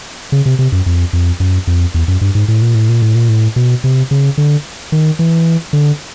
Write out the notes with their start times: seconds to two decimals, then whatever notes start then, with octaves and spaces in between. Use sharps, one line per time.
0.32 C#3
0.46 C3
0.59 C3
0.72 F#2
0.86 F2
1.13 F2
1.40 F#2
1.67 F2
1.94 E2
2.08 F#2
2.21 G2
2.35 G#2
2.48 A2
2.62 A#2
2.75 A2
2.89 A#2
3.02 A2
3.15 A#2
3.29 A2
3.56 B2
3.84 C3
4.11 C#3
4.38 D3
4.92 D#3
5.19 E3
5.73 D3